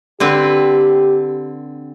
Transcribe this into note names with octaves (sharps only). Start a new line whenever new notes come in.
D3 C4 G4 B4